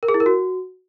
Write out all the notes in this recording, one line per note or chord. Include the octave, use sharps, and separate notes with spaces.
A#4
G#4
E4
A#4
F#4